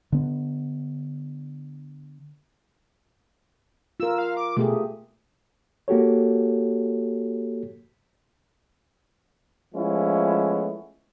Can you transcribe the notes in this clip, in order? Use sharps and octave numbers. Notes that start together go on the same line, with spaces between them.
D3 B3
F4 A#4 E6
F5
D6
B2 A3 G4 G#4
A#3 F#4 G4 A4 C#5
F3 G#3 A3 B3 C#4 E4